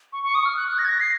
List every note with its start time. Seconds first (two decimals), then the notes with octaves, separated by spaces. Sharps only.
0.13 C#6
0.23 C#6
0.35 D#6
0.45 F6
0.57 F#6
0.68 F#6
0.79 A#6
0.85 G#6
0.89 A#6
1.01 C7